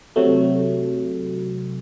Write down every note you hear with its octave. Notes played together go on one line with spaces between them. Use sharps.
C3 F#3 A3